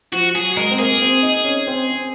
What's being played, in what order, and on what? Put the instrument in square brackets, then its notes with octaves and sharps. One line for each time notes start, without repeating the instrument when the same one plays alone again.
[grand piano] F3 [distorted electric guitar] F#4
[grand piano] F#3 [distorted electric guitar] G#4
[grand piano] G#3 [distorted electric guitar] A#4
[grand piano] C4
[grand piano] A#3 [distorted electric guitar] G#4
[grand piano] C4
D#4
C#4
C4
C4